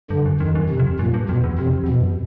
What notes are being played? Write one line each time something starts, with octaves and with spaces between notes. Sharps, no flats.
G2 D3
F#2
F2 D#3
F#2
C3
F2
F#2 A#2
G2
F2 B2
E2
F2 C3
E2
B2
F2
F#2